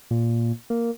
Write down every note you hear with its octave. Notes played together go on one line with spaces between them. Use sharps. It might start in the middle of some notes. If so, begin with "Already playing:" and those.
A#2
A#3